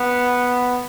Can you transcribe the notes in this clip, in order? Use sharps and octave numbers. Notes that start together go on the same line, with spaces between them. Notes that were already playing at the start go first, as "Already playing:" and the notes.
Already playing: B3